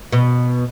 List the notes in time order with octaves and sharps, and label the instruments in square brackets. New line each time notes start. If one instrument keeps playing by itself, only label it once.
[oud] B2